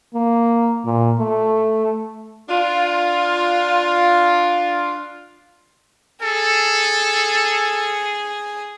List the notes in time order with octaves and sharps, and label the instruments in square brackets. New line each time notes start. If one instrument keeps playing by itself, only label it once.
[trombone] A#3
A#2
A3
[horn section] D4 F4
[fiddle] G#4 [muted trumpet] A4